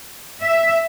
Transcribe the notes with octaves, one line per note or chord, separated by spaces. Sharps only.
E5